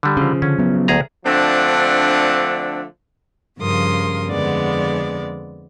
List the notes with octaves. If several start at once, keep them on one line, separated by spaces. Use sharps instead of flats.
D3 G3
C#3 F3
D3 C#4
F#3 B3
D2 G#4 A#5
D3 F3 A3 C4 D4
G2 C#3 F3 A#4 C6 D#6
F2 D3 G#3 B3 D5